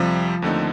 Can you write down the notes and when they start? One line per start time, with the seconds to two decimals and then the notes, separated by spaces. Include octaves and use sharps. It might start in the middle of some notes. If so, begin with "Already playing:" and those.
Already playing: F2 C3 F3 G3 C4
0.42 D#2 D3 A3 C4 D#4